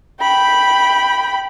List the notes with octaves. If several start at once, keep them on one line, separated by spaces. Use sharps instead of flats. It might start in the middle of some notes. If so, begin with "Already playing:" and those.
G5 B5